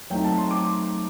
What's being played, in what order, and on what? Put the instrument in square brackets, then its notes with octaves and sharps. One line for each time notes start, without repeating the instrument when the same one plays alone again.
[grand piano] F#3 A3 C4 D#4 G5
A5
C6
D6